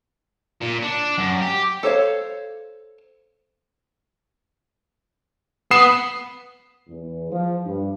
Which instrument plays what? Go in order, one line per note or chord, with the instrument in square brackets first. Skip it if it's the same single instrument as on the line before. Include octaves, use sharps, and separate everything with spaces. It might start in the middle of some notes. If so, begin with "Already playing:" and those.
[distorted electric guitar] A#2
D4
F#2
G4
[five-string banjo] A4 C5 C#5 F5
[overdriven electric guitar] B3 [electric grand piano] D#6 C7 E7
[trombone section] E2
F3
G2